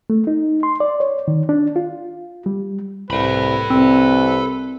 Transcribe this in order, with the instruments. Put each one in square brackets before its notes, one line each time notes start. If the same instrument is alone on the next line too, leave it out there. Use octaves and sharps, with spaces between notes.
[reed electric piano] A3
D#4
C6
D5
C#5
D#3
D4
F4
G3
[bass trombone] C2 [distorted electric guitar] A4 B5 [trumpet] B4
[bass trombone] C2 [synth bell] C4